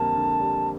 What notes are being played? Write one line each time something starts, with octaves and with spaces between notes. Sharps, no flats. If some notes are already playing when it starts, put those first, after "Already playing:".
Already playing: F2 D3 G3 A#3 A5
D3
G3